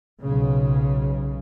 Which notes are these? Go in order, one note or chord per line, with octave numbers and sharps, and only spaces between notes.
B1 C#3